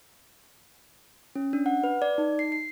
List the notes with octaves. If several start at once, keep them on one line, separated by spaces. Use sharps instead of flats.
C#4
D4
F#5
B4
D5
D#4
C7
C7